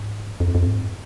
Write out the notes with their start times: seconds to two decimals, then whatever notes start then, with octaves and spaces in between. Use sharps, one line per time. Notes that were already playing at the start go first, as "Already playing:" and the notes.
Already playing: G#2
0.40 F2
0.55 F2
0.67 G#2